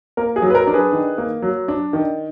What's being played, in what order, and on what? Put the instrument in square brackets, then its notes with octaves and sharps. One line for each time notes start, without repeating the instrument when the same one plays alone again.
[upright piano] A#3 A#4
G#4
F#3
B4
A#4
D4 A#4
G#4 B4
D#3
A#3
F#3
D4
D#3